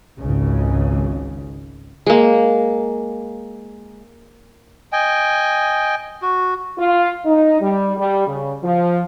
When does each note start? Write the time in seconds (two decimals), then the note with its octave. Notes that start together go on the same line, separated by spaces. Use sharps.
0.18 G#1 C#2 C#3
2.06 G#3 A#3
4.92 D#5 G5 G#5
6.22 F#4
6.78 F4
7.25 D#4
7.60 G3
7.97 G3
8.27 C#3
8.63 F3